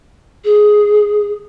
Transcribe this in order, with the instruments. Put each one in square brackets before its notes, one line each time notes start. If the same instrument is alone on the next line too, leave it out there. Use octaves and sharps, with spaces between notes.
[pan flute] G#4